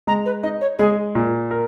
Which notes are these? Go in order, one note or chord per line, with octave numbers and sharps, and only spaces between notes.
G#3 A#5
B4
D#4 D#5
C#5
G#3 G#4
A#2
A#4